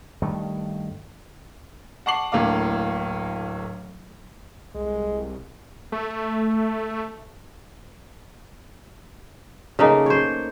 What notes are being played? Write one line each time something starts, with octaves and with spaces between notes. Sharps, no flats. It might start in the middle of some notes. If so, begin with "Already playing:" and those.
G2 D#3 A3
F#5 A5 C#6 D6 C7 F#7
D1 A2 A#3 D4 F5 D6
C2 G#3
A3
C#3 A3 A#3 D#4
C5 C#5